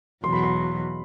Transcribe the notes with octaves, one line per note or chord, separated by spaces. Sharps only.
E2 B2 F#3 C6
B5
C6